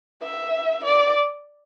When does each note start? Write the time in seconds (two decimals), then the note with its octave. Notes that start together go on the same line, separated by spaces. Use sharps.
0.22 E5
0.84 D5